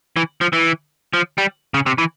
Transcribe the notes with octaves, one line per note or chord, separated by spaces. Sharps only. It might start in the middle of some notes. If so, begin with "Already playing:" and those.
E3
F3
E3
F3
G3
C#3
C3
E3